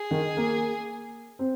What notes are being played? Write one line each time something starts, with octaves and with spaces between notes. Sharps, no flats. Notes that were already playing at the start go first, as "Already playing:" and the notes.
Already playing: G#4
D#3
A#3
C4